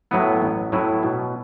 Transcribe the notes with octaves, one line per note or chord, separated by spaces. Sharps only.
A2 F#3 B3 E4
A1
A2 F#3 B3 E4
B2